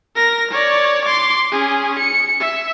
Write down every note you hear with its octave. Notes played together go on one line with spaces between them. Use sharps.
A#4 A#6
C#5 D5
C6 D6
C#4 G#4
C#7
E5